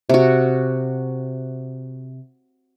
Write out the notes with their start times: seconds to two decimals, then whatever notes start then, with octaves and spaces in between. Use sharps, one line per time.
0.09 C3 F#4